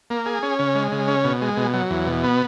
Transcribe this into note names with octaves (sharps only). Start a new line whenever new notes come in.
A#3
G#4
C#4
C#3
G#3
C#3
C#4
B2
G#3
B2
F#3
E2
B2
B3